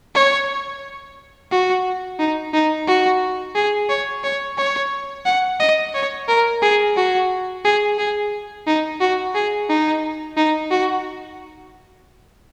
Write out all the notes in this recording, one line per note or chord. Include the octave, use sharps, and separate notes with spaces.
C#5
F#4
D#4
D#4
F#4
G#4
C#5
C#5
C#5
F#5
D#5
C#5
A#4
G#4
F#4
G#4
G#4
D#4
F#4
G#4
D#4
D#4
F#4